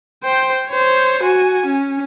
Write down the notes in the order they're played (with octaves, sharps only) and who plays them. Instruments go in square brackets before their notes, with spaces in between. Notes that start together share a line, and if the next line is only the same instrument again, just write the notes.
[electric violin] C5 G5
C5 C#5
F#4 G#5
C#4